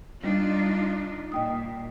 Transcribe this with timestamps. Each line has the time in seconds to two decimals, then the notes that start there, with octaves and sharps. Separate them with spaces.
0.24 G3 D4 D#4 F4
1.32 A#2 D#5 G5 D#6